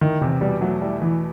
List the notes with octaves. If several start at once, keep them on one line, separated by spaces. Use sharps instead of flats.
D#3 E4
E2 C3
B2 G3
F#3 A3
G3 E4
E2 E3